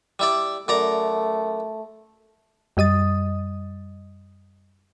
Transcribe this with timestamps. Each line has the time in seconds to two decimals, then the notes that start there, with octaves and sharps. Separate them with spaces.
0.19 G3 E4 D5
0.68 F#2 A3 D5 A#5
2.77 F#2 G3 D#5 D#6 A6